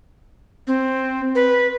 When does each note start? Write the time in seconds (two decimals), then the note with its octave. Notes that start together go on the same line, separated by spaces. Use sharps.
0.67 C4
1.35 B4